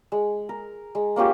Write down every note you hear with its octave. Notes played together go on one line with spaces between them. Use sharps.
G#3
A#4
G#3
A#3 C#4 F4 G4